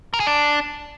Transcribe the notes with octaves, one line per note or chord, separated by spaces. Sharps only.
A#4
G#4
D4